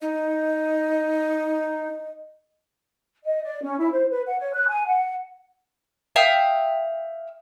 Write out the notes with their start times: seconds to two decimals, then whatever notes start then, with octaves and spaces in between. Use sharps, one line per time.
0.02 D#4 D#5
3.25 D#5
3.44 D5
3.62 C#4
3.79 E4
3.93 C5
4.11 B4
4.27 F#5
4.39 C#5
4.54 F#6
4.69 G#5
4.87 F#5
6.16 E5 F5 G5 D#6